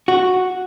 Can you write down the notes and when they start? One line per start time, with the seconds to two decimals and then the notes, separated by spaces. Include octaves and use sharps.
0.08 F#4